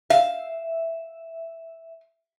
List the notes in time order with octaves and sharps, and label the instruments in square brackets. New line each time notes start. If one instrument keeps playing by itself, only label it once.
[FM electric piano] E5 [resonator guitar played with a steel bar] F5